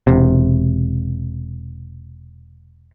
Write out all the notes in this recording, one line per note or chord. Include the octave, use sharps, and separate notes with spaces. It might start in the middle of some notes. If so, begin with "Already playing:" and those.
E1 C3